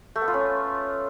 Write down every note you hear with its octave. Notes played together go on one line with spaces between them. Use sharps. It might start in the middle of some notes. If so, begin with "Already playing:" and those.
A3
B3
F4
C#4